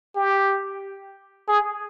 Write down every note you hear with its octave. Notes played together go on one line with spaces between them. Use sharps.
G4
G#4